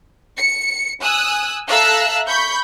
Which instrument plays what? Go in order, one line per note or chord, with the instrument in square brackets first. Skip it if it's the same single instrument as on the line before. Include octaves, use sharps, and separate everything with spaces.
[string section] C#7
G#5 D#6 E6 F#6
A4 E5 F5 A#5 E6 F#6
B5 C#6 G6